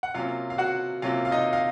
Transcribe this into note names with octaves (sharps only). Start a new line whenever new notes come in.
F#5
C3 F#3 A#3 C#4 F4 F5
F5
F#4 F#5
C3 F#3 A#3 C#4 F4 F5
F5
D#4 D#5
F5